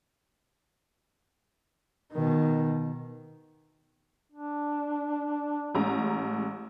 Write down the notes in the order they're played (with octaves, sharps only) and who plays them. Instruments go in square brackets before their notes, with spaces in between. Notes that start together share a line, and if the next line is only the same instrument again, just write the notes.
[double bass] B2 D#3
[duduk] D4
[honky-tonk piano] A1 G#3 A#5